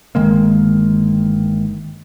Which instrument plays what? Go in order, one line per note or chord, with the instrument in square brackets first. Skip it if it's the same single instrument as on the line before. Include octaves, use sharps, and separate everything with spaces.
[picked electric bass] G1 D#3 G#3 A#3